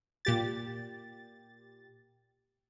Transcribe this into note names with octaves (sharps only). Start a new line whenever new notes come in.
A#2 G4 A6